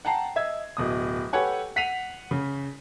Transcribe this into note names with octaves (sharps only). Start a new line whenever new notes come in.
F#5 G5 A5 A#5 C7
D#5 E5 E6 G#6
D1 B2 D#6
G4 A4 B4 C#5 F#5 G#5
F#5 B6 C7 D#7 F7
C#3